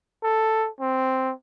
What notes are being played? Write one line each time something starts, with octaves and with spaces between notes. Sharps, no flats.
A4
C4